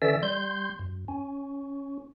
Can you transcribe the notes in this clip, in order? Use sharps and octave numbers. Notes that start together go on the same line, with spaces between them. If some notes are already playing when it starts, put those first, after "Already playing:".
D3 E3 C#4 D5 E5 E6
G3 C6 G6
F#2
C#4